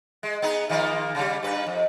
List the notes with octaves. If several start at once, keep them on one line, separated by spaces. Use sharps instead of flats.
G#3
B3 D#4 G#4
D#3 F3 A#3
C#3 G3
G2 B4
F2